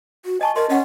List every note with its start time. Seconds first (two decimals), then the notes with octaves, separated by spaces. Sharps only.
0.26 F#4
0.41 D#5 G#5 A5 C#6
0.56 A#4 D#5 C6
0.70 C#4 D#5 F#5